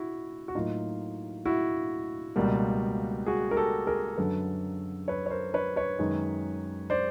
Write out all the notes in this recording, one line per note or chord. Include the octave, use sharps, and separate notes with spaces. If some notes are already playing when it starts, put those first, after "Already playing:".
Already playing: E4 F#4
F#4
A2 F#3 A#3 D#4 F4
E4 F#4
C#2 B2 G3 A#3
F#4 G#4
A#4
G4 A4
G#4 A#4
F#2 D3 F#3 A4 B4
B4 C#5
C#5
A#4 C5
B4 C#5
B4 C#5
F#2 D#3 G#3
C5 D5